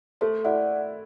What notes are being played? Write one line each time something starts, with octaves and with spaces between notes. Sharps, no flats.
A3 A4 C5
E4 D5 F#5